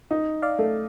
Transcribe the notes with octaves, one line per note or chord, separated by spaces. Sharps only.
D#4
D5 F5
A3